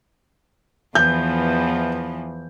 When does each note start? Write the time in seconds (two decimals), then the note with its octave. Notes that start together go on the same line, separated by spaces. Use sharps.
0.95 E2 E3 F3 G6